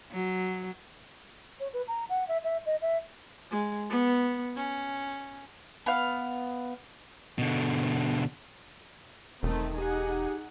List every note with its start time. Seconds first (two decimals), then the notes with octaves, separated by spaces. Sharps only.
0.11 F#3
1.60 C#5
1.74 B4
1.88 A#5
2.09 F#5
2.28 E5
2.44 E5
2.66 D#5
2.82 E5
3.51 G#3
3.90 B3
4.56 C#4
5.86 B3 F5
7.38 B2 D3
9.43 E1 D#3 A3 C4
9.76 D#4 G4 G#4 F#5